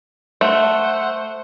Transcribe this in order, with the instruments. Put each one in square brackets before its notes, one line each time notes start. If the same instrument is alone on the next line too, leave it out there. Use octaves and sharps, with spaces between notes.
[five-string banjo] A3 [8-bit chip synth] C5 F#5